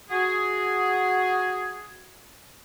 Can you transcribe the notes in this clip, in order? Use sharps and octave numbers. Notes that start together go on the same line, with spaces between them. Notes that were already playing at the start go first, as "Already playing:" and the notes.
F#4 G#4